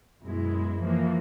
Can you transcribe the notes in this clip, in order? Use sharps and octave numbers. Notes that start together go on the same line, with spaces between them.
F#2 B2 G#3 E4
E3 F3 A#3